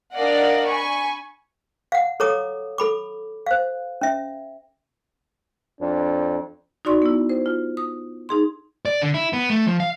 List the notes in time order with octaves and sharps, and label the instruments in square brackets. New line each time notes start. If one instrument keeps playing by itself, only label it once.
[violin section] D4 A#4 D5 D#5 F5 F#5
G#5 B5 C#6
[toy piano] F5 F#5
A4 C#5 A#5 D6 D#6
A4 B5 D6
C5 F5
C#4 E5
[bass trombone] F2 [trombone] D4
[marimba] D#4 F#4 D5 C6 C#6
B3 E4
C5
F4
D#6
D#4 G#4 C6
[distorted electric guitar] D5
D3
E4
B3
A3
F3
F5